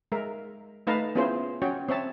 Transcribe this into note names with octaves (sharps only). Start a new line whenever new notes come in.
G#3 A#4 E5
A3 D#4 B4 F5 A5 A#5
B3 C#4 E4 F4 G#4 C5
C#4 F#4 C#5 G5
C4 C#5 E5 A5